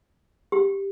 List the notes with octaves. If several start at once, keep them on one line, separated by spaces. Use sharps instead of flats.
G4